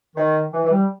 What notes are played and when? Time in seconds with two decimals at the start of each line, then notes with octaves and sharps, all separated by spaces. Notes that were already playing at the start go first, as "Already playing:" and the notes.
0.16 D#3
0.53 E3
0.65 E3
0.71 G3